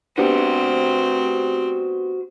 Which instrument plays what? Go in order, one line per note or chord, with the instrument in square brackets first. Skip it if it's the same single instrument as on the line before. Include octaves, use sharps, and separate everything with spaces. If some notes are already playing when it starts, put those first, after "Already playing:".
[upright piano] B3 D4 G4 [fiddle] C4 [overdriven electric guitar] F#4 C5